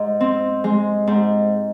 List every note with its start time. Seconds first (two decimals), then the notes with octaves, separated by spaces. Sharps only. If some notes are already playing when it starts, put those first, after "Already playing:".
Already playing: G#2
0.20 C4
0.64 G#3
1.07 G#2